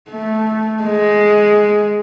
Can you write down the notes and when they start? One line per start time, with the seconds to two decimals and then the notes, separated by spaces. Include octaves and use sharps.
0.10 A3
0.83 G#3